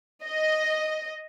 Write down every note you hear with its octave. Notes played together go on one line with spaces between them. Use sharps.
D#5